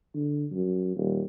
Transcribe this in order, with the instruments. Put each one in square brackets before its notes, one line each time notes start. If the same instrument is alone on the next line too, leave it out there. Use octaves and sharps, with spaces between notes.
[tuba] D3
F#2
D#1